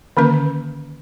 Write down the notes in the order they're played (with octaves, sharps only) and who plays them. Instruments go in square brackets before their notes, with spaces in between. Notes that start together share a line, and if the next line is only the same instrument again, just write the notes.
[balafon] D3 D#3 A#3 C#4 B4